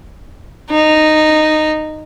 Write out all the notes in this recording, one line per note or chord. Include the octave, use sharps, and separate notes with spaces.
D#4